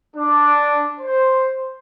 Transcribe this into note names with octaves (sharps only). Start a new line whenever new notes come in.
D4
C5